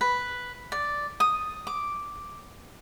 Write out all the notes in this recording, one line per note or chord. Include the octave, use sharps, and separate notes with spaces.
B4
D5
D#6
D6